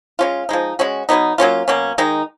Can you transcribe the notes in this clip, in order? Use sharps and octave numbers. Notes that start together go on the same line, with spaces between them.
G#3 C#4 F4
F3 G#3 D#4
G#3 C#4 F#4
B2 F#3 B3 D#4
F#3 A#3 C#4 F4
B2 F#3 A#3 C#4
D#3 G#3 D#4